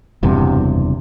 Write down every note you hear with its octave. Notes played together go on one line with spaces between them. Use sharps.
F#1 E2 G2 C3